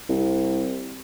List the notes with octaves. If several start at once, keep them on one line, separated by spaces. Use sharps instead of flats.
C2